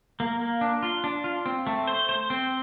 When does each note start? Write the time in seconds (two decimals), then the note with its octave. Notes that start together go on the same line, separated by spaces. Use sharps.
0.20 A#3
0.40 A#3
0.61 D4
0.83 F4
1.04 D4
1.24 F4
1.46 C4
1.67 A3
1.87 C5
2.09 C5
2.30 C4